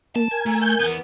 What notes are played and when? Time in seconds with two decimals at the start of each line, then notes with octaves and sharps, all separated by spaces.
0.16 A#3 A5
0.31 A#4 G#5
0.46 A3
0.61 G#5 G6
0.80 E2 B3